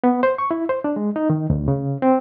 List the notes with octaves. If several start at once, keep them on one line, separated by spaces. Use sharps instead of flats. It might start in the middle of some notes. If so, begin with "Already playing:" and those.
B3
C5
C#6
E4
C5
D4
G#3
D#4
D#3
D2
C#3
C4